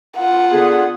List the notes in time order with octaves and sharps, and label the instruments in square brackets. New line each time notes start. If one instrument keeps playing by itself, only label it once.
[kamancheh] F4 F#5
[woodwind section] D3 B3 G#4